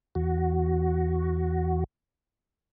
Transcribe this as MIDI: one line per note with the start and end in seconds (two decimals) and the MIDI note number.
0.15 1.84 40
0.15 1.84 66